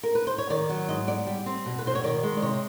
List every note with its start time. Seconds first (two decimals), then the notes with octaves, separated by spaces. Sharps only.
0.03 A#4
0.15 B4
0.27 C5
0.38 C#5
0.50 D#3 D5
0.69 F#3
0.88 G#2 D#5
1.07 B3 D5
1.27 G3
1.46 C4
1.66 B2
1.79 B4
1.85 B2 C5
1.95 C#5
2.04 D#3 D5
2.23 G#3
2.37 D5
2.42 C3 C#5